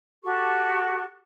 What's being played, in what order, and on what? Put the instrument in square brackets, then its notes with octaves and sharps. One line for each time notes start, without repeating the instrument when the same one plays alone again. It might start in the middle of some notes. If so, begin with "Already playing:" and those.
[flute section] F#4 G4 A4 C#6